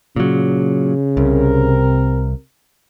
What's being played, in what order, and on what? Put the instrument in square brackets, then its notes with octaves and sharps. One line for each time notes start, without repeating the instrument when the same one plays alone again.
[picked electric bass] A#2 F#3 [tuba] C#3
[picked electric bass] C2 [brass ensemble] C3 C4 A#4